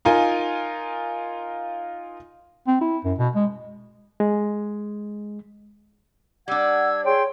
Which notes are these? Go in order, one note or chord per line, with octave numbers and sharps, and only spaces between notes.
D#4 F4 A#4 G#5
C4
E4
F#2
B2
G#3
G#3
G3 D4 F#5 E6 G#6
G#4 C#5 G5 C6